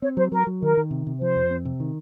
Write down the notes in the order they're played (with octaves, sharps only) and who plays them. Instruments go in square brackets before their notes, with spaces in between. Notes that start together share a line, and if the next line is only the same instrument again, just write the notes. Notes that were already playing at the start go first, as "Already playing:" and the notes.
[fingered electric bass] C4 [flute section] C#5
[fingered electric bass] F#3 [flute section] C5
[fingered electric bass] F#3 [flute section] A#4
[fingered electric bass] F#3
[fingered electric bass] D#3 [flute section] A#4
[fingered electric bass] D#3
C3
C3
[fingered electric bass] F3 [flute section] C5
[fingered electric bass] F2
C4
C3
D#3